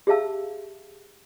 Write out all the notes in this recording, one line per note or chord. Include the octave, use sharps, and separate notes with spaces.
G4 G#4 E5 F5 A5 E6